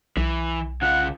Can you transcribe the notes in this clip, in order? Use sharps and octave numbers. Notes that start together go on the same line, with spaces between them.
B1 E3
C#3 F4 F#5